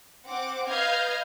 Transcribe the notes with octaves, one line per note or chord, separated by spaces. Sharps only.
C4 F#5 D6
B4 D#5 F5 F6 G6 G#6